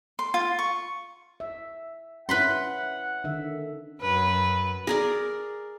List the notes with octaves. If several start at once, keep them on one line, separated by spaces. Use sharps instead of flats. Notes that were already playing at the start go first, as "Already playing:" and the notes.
C6
F4
C#6
E5
C#4 E4 B4 F#5 B5 C6
D3 D#3 E5
F#2 B4
G#4 A#4 D5